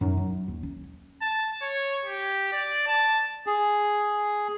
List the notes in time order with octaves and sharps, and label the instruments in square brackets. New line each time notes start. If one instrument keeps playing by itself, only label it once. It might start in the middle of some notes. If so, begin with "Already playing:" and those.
[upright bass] F#2 D#4
F#3
D#2
C#4
[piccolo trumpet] A5
C#5
G4
D5
A5
[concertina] G#4